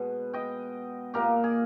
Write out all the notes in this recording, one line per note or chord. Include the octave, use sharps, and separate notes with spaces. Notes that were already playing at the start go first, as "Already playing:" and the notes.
Already playing: B2 G#3 B3
D#5 G5
A#2 A#3 G4 A#4
G#4